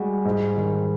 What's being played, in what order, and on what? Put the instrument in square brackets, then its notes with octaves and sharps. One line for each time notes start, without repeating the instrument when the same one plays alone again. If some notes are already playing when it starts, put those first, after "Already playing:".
Already playing: [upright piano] G3 [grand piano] G#3 F#4
[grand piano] G#2
D#3